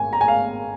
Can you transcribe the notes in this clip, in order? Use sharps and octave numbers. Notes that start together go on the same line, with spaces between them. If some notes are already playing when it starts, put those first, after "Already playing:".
Already playing: G#1 G#5
A#5
G#5
F5